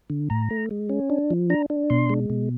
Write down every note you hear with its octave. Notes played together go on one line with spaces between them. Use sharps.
D3
A2 A#5
A3
G#3
C#4
D4
F3
D4 A#5
D4
B2 C6
G#3
B2